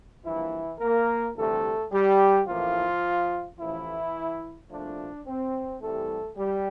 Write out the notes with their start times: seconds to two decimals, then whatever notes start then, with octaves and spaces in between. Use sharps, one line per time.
0.25 G2 E3 F3 A#3 E4
0.80 A#3 A#4
1.36 D2 C3 E3 G3 A3 A4
1.91 G3 G4
2.47 A1 A2 E3 F3 A#3 F4
3.59 A1 A2 E3 F3 E4
4.70 C2 A#2 F3 A3 D4
5.26 C4
5.81 C2 C3 E3 G3 A3 A4
6.37 G3 G4